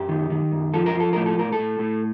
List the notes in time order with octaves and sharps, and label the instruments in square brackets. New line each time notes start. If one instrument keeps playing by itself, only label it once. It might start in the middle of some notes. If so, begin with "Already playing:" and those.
Already playing: [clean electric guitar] F#2 G4
D#3
D#3
F#2
F3 A4
A#4
F3
A4
A2 A#4
A4
A2 A#4
A4
A2
A2